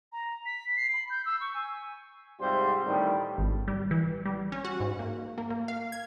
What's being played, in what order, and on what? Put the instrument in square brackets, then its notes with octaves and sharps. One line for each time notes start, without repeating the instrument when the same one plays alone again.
[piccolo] A#5
B6
C7
B5
G6
E6
C#6
G#5
[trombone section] G#2 C3 G3 C4 F4 C5
A2 D3 D#3 G3
[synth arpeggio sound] G#1
G3
E3
G3
C#4
F#4
G#2
A#3
A#3
A#3
F5
G#6